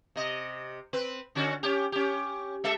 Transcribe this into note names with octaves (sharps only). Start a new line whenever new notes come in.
C3 D#5
C4 B4
D3 C#4 F#4
C#4 G4
C#4 G4
G#3 A4 E5